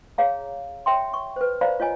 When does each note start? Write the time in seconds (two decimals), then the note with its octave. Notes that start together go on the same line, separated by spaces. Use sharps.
0.18 G#4 C#5 F5 A#5
0.86 C#5 E5 G5 C6
1.14 C#6
1.36 B4 C5
1.61 C5 D5 F5 A#5 B5
1.80 F4 C#5 D#5 G#5